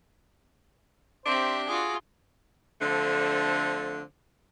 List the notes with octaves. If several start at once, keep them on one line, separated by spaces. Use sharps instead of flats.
C4 D4 G4 C5 E5
F4 F#4 G#4 D6
D3 F3 A3 C4 D4